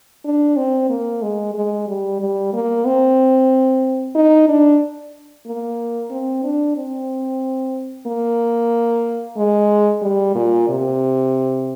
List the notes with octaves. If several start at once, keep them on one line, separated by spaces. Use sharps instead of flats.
D4
C4
A#3
G#3
G#3
G3
G3
A#3
C4
D#4
D4
A#3
C4
D4
C4
A#3
G#3
G3
A#2
C3